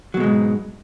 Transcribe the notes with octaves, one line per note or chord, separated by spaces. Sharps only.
E2 G#2 B2 F#3 G#3